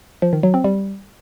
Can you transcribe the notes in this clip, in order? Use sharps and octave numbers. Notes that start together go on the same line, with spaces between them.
F3
D#3
F#3
C4
G3